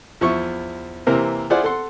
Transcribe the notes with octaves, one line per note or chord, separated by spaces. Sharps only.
E2 F3 E4 C#6
C3 E3 A#3 A#4 C5
E4 F4 G#4 C5 D5 F#5
A4 F#5 C6